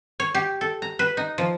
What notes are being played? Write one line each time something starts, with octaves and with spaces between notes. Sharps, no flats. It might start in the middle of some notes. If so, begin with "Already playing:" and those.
C#5
G4
A4
A#5
B4
D#4
F3